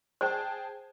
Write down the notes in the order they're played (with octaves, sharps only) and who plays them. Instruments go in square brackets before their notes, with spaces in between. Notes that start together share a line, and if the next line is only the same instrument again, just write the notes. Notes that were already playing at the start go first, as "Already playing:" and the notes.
[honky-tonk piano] G#4 G5 A5 [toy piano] C5